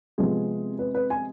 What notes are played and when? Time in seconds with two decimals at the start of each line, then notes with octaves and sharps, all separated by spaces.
0.18 C3 F3 G#3 B3 G#4
0.79 B4
0.94 B4
1.10 G#5